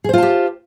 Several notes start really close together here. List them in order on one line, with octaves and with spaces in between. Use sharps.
G#4 C5 F4 A5 G4